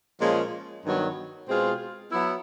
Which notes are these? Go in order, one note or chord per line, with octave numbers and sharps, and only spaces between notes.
A#2 F3 G#3 C#4
G2 D#3 F#3 B3
B2 G#3 C4 F4 G#4
F#3 B3 E4